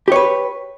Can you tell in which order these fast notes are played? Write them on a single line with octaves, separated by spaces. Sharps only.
G4 C#5 B4